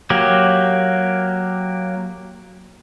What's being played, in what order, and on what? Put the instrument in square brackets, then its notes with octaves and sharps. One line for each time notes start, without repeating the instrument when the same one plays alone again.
[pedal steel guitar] F#3 A#3 G4